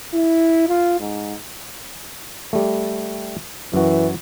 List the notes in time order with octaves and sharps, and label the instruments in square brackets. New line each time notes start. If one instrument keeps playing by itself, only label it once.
[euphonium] E4
F4
G#2
[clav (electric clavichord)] G3 A3
[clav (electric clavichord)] F#2 F#4 [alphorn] E3